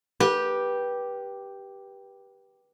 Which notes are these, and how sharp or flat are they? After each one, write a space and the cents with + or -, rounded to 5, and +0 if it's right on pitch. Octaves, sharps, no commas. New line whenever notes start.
G4 +0 B4 -25